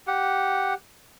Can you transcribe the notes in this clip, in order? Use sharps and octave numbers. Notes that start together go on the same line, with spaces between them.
G4 F#5